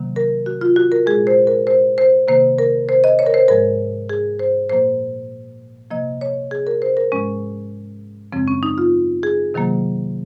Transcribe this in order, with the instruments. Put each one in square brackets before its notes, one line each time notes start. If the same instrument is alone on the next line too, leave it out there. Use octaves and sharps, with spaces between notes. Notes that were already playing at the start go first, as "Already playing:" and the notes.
Already playing: [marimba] C3 D#3 F#3 A#3
A#4
F#4
F4
F#4
A#4
G#3 G#4
A#2
C5
A#4
C5
C5
C3 D#3 A#3 C5
A#4
C5
D#5
C#5
A#4
C5
G#2 F3 G#3 A#4
G#4
C5
A#2 F3 A#3 C5
C3 F3 A#3 D#5
C#5
G#4
A#4
C5
A#4
G#2 F3 G#3 C#4
F#2 C#3 F3 G#3 C4
C#4
D#4
F4
G#4
C3 D#3 F#3 A#3